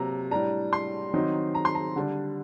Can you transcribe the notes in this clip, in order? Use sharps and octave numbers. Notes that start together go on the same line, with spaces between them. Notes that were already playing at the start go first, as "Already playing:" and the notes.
Already playing: C3 F#3 A#3 A#5
A2 G3 D4 A#5
C6
D#3 F#3 C4 D#4
A#5
C6
A#5
D3 G3 D4